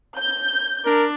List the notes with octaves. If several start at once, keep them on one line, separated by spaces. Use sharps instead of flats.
G6
D4 A#4